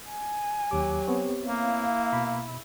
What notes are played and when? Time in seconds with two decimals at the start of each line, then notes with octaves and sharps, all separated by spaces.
0.10 G#5
0.71 D#2 F#3 G4 D6
1.08 B3 C4 C#5
1.47 A#3 E4 F5
2.13 B2 B5